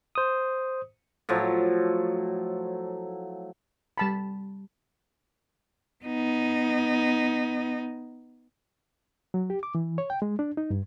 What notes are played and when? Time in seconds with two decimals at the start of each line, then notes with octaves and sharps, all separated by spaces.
0.15 C5 D#6
1.29 A2 F3 F#3
3.98 G3 A5 B5
6.04 B3 D#4
9.34 F#3
9.50 G4
9.63 D6
9.75 E3
9.98 C#5
10.10 G5
10.22 G#3
10.39 D4
10.57 D#4
10.71 G2